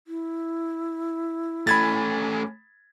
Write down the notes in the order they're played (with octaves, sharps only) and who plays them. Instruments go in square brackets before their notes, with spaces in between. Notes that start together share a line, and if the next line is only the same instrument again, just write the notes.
[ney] E4
[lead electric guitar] A3 C#4 [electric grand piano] B5 G#6 A6